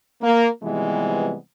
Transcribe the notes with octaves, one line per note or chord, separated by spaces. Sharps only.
A#3
C3 E3 F3 G3 G#3 B3